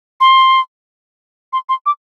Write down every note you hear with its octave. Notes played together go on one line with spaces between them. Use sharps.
C6
C6
C6
D6